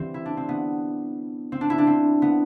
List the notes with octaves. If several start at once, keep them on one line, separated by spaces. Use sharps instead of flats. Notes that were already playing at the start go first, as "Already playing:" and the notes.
Already playing: E3 G3 C4
E4
D4
C4
B3
C4
D4
E4
D4
C4
B3